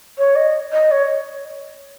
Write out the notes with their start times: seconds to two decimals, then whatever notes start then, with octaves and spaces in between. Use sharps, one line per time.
0.18 C#5
0.36 D#5
0.72 D#5
0.91 C#5